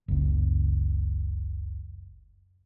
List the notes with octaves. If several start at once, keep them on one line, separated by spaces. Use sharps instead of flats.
F#1 C#2